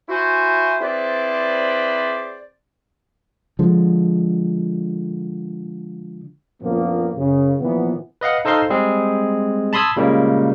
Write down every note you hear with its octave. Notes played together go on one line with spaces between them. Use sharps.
E4 F#4 C5 G#5
C4 E4 G#4 B4 C5 D5
D3 F3 G#3
F#2 A#2 D3 F3 A#3 B3
F#2 C#3
A#2 E3 F3 B3
B4 D#5 F5 F#5
D#4 A4 C5 D#5 F5 C6
G3 G#3 C4 G#4
A5 B5 C6 D#6 E6 G#6
A#2 C#3 G3 G#3 A#3